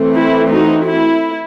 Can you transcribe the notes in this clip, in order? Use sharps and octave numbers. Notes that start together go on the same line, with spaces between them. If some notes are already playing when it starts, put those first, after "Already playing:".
Already playing: E3 A3 C4
E4
D#4 F#4
E4